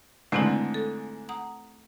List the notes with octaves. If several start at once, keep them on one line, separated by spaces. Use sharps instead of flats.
G#2 D3 E3 A3 C4 E4
A4
F#5 A#5 D#6